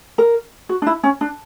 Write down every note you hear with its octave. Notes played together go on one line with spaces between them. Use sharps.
A#4
F#4
D4
E4
C#4
D4